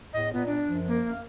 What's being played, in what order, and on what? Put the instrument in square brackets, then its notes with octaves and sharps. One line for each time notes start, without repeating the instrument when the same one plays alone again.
[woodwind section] E2 A2 [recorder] D#5
[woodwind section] A#2 [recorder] B3
[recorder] D4
[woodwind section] F#2 F3
[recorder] A#3
[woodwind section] F#2 F5